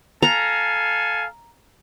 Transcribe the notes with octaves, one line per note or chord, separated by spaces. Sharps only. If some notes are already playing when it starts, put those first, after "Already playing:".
A4 F5 G#5 A#5